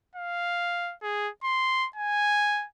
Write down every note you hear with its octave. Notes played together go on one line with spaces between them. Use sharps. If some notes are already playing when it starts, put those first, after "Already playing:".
F5
G#4
C6
G#5